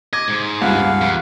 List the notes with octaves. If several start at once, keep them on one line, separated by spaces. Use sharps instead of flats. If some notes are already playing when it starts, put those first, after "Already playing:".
D#5 D6 G#6
G#2
C#2 G2 F5 F#5
F2